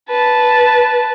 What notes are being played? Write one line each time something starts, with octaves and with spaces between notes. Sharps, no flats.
B4 A5